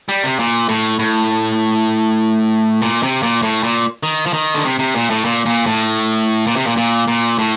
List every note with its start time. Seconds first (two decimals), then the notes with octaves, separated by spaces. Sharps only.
0.09 G3
0.24 C3
0.39 A#2
0.69 A2
0.99 A2
2.82 A#2
3.03 C3
3.23 A#2
3.42 A2
3.63 A#2
4.03 D#3
4.26 F3
4.33 D#3
4.54 D3
4.65 C3
4.79 C3
4.95 A#2
5.10 A2
5.25 A#2
5.46 A#2
5.66 A2
6.47 A#2
6.56 C3
6.67 A#2
6.77 A#2
7.08 A#2
7.39 A2